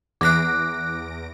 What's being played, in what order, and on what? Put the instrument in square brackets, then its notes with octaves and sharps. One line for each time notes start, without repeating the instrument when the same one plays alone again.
[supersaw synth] E2 A#6 D7 [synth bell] D6 F#6